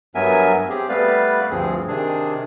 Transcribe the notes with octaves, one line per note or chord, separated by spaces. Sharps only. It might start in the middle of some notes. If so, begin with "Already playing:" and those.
G2 F#3 B3 A#4 E5 G#5
C4 G4 G#4
G3 A3 B3 B4 D5 F5
D2 G2 F3 C4 G#4
C3 D#3 D4 G#4